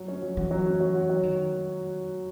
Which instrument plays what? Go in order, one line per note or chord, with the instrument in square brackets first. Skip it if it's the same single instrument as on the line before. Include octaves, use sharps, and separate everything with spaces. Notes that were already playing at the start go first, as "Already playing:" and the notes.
Already playing: [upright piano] F#3
C#4
F#3
[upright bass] E3 [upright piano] F#4
[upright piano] F#3
C#4
F#3
F#4
F#3
[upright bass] D#3